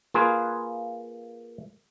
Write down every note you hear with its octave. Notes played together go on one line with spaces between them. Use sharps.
A#3 F4 G#4 B4